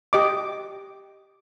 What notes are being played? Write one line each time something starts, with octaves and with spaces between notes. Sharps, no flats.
G4 D#5 D6